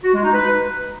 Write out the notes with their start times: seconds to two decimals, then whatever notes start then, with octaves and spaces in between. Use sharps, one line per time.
0.04 F#4
0.14 G#3
0.24 D#4
0.34 B4